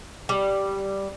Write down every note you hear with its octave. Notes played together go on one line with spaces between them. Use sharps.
G3